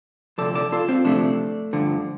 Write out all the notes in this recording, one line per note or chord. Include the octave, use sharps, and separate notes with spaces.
D2 C3 F3 A4 D5
A4 D5
F4 A4
C4 F4
D2 C3 F3 A3 D4
G2 D3 F3